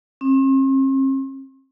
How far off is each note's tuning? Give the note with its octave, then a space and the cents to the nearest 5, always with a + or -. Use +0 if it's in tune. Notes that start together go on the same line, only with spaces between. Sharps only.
C4 +45